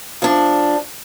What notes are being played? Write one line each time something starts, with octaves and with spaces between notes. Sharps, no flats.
F3 D4